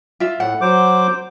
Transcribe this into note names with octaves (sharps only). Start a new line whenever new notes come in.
F4 E5
A2 F#5
F#3 C5 D6